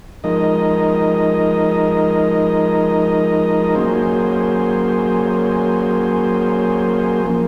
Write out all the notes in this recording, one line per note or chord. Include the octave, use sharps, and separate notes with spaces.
F3 G#3 D#4 A#4 D#5
F#3 A#3 C#4 G#4 C5
F3 A#3